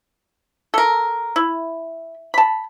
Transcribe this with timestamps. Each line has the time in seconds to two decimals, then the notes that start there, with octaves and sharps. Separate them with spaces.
0.74 A4 A#4
1.36 E4
2.34 A5 B5